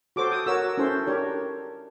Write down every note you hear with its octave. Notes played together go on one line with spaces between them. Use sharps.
F#4 A4 C5 D6
D#6
F#4 A#4 C#5 E6
C#4 E4 A4 C5
D4 G4 A#4 C#5